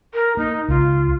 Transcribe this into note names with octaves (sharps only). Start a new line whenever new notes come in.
A#4
A#3 D#4
C#2 F4